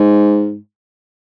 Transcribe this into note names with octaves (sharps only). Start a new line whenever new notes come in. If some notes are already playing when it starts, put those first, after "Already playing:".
Already playing: G#2